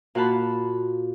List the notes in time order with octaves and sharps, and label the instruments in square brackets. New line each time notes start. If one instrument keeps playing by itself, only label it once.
[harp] A#2 F#4 F5 F#5 A5 B5